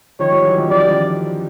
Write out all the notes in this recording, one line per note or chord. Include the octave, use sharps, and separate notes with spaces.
D#3 F3 C#5
F3 G3
E3 F#3
D#3 F3
F3 G3 D5
D#3 F3